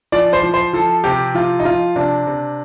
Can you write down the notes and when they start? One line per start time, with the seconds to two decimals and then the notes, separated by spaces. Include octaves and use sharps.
0.12 F3 D5
0.33 C5
0.43 F3
0.54 C5
0.73 F3 A4
1.04 C3 G4
1.34 F3 F4
1.59 D#4
1.65 F3 F4
1.96 C3 D4
2.27 C3